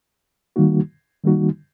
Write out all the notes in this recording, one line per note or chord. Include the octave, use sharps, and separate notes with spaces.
D#3 G3 A#3 D#4 F#4
D#3 G3 A#3 D#4 F#4